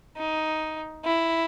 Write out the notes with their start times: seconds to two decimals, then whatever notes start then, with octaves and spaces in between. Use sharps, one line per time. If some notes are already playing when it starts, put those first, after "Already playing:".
0.17 D#4
1.04 E4